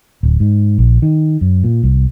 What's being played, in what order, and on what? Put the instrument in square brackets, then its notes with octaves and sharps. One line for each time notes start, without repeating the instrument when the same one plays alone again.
[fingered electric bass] D1
G#2
A#1
D#3
F#2
A#2
C2